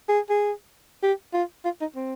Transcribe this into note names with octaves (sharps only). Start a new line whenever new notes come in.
G#4
G#4
G4
F4
F4
D#4
C4